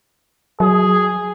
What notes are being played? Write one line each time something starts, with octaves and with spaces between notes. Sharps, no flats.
F#3 G#4